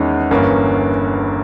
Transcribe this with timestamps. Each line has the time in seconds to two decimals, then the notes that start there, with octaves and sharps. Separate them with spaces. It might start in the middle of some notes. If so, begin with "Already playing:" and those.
Already playing: E2 D#3 G#3 C#4
0.31 G1 G2 E3 A#3 C#4